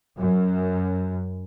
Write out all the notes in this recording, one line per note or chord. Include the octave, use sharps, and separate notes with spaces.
F#2